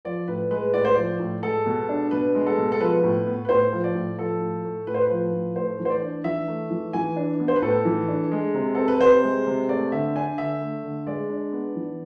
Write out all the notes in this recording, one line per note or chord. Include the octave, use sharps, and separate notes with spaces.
F3 D5
A2 B4
G#3 B4
A2 D5
C5
F3 D5
A2
G#3 A4
B2
D4
B2 B4
G#3
A4
B2
A4
F3 B4
A2
B3
B4
A2 C5
F3
D5
A2
F3 A4
A2
A3
A2 B4
C5
B4
F3
A2
A3 C5
E3
C5
D5
D4
E3 E5
A3
E3
E3 G#5
D4
B3
C5
B4
A2 A4
E3
D4
G#3
C3
C4 A4
B4
C3 C5
G#3
C3
A3 D5
D3 E5
D4 G#5
D3 E5
A3
D3
G#3 D5
D4
B3
E3